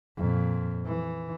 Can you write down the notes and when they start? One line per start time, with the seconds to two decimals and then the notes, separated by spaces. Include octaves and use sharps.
0.17 F2 A#2
0.86 E3